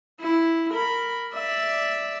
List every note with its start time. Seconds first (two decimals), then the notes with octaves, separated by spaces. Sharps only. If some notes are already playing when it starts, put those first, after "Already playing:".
0.20 E4
0.72 A#4 B5
1.34 D5 E5